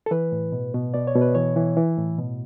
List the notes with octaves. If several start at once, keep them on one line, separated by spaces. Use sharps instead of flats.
A4
E3 B4
A2
B2
B2
B2 D5
C#5
B2
B4
E3 C#5
E3
E3
A2
B2